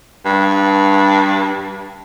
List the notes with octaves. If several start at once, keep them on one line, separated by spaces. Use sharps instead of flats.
G2